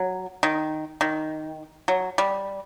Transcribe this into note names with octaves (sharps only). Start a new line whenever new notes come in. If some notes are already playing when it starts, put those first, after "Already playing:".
Already playing: F#3
D#3
D#3
F#3
G3